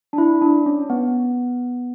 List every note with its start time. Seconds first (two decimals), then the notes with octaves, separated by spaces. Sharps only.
0.13 D4
0.18 E4
0.42 D4
0.66 C#4
0.90 B3